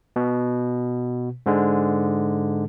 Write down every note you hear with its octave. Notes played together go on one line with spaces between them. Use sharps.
B2
G#2 D3 G#3